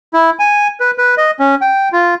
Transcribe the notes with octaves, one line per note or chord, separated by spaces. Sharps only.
E4
G#5
B4
B4
D#5
C#4
G5
F4